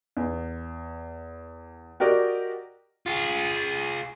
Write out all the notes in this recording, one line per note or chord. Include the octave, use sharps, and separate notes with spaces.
E2
F#4 G4 A#4 D5 D#5
F4 G#4